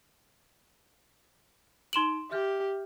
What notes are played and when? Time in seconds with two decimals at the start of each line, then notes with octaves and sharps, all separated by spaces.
1.93 D#4 C6 D7 E7 F#7
2.31 G4 E5 F6 G6